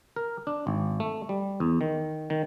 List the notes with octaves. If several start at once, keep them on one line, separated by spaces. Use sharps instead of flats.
A#4
D4
G#1
A3
G3
E2
D#3
D#3